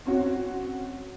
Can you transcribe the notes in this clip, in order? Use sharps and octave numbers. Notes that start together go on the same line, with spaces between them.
C4 C#4 F#4